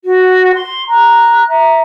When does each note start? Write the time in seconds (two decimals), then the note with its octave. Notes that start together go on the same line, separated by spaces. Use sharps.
0.06 F#4
0.54 C6
0.88 A#5 F#6
1.49 E5 A#5